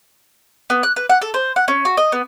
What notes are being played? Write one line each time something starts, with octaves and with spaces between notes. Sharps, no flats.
B3
F#6
B4
F#5
A4
C5
F#5
C#4
F#4
D#5
B3